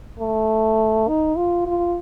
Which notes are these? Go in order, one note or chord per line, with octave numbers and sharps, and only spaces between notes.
A3
D#4
F4
F4